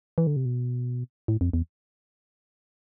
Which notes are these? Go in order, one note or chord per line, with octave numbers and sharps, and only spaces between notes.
E3
D3
C3
B2
A2
F2
E2